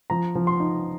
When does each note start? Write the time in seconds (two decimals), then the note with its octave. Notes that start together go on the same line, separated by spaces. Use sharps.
0.10 F3 A#5
0.35 F3
0.47 C6
0.60 D#4